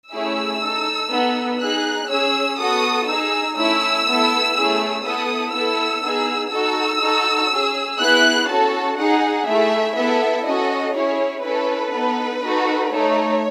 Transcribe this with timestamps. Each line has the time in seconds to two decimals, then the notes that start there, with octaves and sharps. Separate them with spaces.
0.12 A3 C#4 E4 G#4 E6
0.62 D#4 A4
1.11 B3 D#4 A4
1.61 D#4 G#4 F#6
2.09 C#4 G#4 E6
2.59 B3 F#4 A4 D#6
3.07 D#4 G#4 E6
3.57 A3 C#4 E4 E6
4.06 B3 E4 A4
4.56 A3 C#4 E4 G#4
5.05 B3 E4 A4 D#6
5.54 B3 E4 A4 E6
6.03 B3 D#4 G#4
6.52 D#4 F#4 A4 E6
7.01 D#4 F#4 A4
7.50 C#4 G#4
8.00 B3 E4 G#4 F#6
8.49 C#4 F#4 A4 A5
8.98 D#4 G#4 F#5
9.47 A3 E4 G#4 E5
9.97 B3 E4 A4 E5
10.47 C#4 F#4 A4 D#5
10.95 C#4 E4 G#4 C#5
11.44 C#4 E4 A4 B4
11.93 B3 D#4 A4
12.43 D#4 F#4 A4
12.92 A3 D#4 A4 C#5